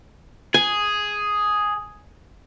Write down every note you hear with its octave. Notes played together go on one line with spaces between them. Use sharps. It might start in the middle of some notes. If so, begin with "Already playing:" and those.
G#4 G#5